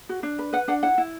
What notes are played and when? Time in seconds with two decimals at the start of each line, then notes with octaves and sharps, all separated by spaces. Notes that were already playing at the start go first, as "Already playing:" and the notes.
0.09 F#4
0.23 D4
0.39 B4
0.53 B4 F#5
0.68 D4 F#5
0.83 E4 F#5
0.98 E4